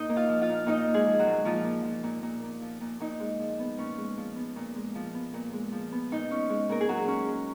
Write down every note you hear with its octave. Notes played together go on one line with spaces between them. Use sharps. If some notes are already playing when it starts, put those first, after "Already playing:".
Already playing: A#2 D#4 D#5
A#3
F4 F5
F3
F4 F5
A#2
A#2 D#4 D#5
A#3
G#3 G#4
F3
F#3 F#4
A#2
A#2 F3 F4
A#3
F3
A#2
A#2
A#3
F3
A#2
A#2 D#4
G#3
F3
B3
A#2 C#4
G#3
F3
B3
A#2
G#3
F3
B3
A#2
G#3
F3
B3
A#2 D#4
C#4
G#3
A#2 A#4
G#4
A#2 F#3 F#4
C#4
G#3